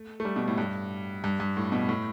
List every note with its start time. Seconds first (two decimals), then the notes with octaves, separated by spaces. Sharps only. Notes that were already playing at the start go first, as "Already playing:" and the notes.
Already playing: A3
0.20 A3
0.25 G3
0.36 B2
0.48 A2
0.58 G2
1.24 G2
1.40 G2
1.57 A2
1.72 B2
1.89 A2